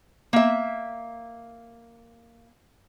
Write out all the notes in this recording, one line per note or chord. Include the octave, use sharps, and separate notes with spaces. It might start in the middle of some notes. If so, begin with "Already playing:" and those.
A#3 E5